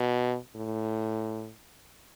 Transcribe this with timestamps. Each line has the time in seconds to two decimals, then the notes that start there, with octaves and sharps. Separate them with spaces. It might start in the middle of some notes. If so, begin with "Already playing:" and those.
Already playing: B2
0.56 A2